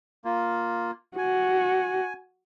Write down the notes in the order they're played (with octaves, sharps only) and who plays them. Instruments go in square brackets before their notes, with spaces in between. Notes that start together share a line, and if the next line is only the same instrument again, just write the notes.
[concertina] A#3 F4
[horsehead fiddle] F#4 [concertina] G#5